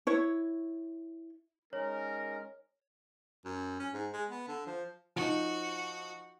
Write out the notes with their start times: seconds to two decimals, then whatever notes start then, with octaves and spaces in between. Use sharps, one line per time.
0.07 E4 C#5
1.73 G#3 C#4 D#4 A#4 C#5
3.45 F#2
3.80 C#4
3.93 G#2
4.13 G#3
4.30 B3
4.48 D3
4.67 F3
5.16 F3 D#4 F#4